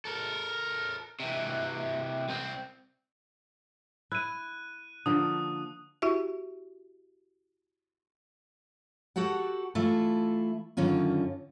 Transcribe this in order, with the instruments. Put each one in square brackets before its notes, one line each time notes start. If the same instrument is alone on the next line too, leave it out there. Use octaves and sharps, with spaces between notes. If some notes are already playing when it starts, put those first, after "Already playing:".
[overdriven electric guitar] A4 A#4
C3 E3
C2 C4
[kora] E4 [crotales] F#6 D#7
[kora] D3 F3 A#3 [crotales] D#6
[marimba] E4 F#4 G4 E5
[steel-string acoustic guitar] F#4 G4 A4 F#5
E3 A3 E4 F4 A4
F#2 D3 D#3 C#4 F4